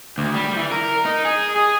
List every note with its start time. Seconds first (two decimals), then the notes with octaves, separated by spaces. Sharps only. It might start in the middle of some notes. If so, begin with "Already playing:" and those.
0.18 D2
0.34 G3
0.57 E3
0.72 A#4
1.06 D#4
1.25 G#4
1.56 G#4